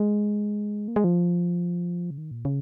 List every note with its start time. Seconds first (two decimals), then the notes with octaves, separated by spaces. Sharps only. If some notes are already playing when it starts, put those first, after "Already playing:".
Already playing: G#3
0.88 A#3
0.96 G#3
1.04 F3
2.11 C#3
2.18 D#3
2.31 A#2
2.45 C#3